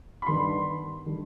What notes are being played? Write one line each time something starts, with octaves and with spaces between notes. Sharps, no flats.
B5
G2 D#3 B3 D4 C6
D#3 G3 D4